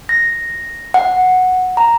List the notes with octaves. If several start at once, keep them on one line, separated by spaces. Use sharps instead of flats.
A#6
F#5
A#5